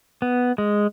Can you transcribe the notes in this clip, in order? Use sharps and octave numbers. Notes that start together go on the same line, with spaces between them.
B3
G#3